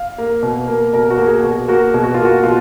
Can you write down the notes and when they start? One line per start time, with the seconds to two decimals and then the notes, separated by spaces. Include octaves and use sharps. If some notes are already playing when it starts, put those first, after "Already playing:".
Already playing: F5
0.18 A#3
0.43 B2
0.68 A#3
0.93 B2 A#4
1.10 F#4
1.18 A#3
1.27 G#4
1.43 B2 F#4
1.68 A#3 F#4
1.94 B2 G#4
2.04 F#4
2.14 A#3 F4
2.25 F#4
2.43 B2 F4